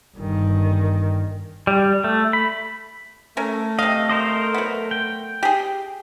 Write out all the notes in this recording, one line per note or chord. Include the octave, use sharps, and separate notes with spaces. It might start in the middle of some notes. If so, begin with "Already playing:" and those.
G1 D#3
G3
A3
B5
A3 C#4 A#4
C3 D#5 F5
A#4 C5 D#5
F#3 B3
G5
G4 G#4